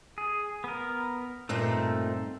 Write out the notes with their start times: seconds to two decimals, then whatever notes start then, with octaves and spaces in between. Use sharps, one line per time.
0.18 G#4
0.64 B3 A#4
1.49 G2 A#2 A3 C4 D#4